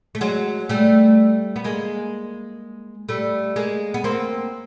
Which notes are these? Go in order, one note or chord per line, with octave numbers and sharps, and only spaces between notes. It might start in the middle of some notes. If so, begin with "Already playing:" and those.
A3
F#3 G#3
G3 A3
B3
G#3 A#3
G3 A3
G#3 A#3
B3
A#3 C4